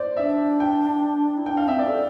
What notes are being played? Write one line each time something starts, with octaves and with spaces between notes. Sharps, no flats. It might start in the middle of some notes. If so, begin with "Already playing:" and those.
Already playing: C5 D5
D4 E5
G5
E4
D4 G5
F5
C4 E5
D5
A4